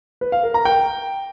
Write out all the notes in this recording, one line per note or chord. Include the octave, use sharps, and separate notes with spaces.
B4
F5
A#4
A#5
G5